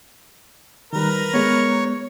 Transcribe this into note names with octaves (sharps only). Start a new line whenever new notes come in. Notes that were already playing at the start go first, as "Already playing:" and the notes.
D#3 G3 A#4 B4 A#5
G#3 B3 C#5